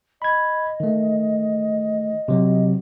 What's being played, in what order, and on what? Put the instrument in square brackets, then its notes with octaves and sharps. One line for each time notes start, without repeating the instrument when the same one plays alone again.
[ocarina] D#5 [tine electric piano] B5 G#6
[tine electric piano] D#3 A3
C3 F#3